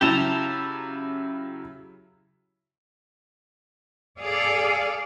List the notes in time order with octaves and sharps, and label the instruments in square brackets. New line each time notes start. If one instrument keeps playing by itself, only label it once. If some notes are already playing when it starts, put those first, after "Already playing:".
[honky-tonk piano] C#3 F#3 E4 [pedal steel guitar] G4 A5 A#5
[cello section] G#4 A4 D5 F5